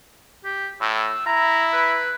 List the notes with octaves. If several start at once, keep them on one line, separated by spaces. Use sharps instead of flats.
G4
A2 E6
E4 A#5
B4